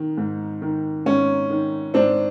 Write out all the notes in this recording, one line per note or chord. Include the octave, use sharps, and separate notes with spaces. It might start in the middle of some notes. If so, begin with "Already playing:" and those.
Already playing: D#3
G#2
D#3
G#2 C#4
D#3
G#2 C4 D4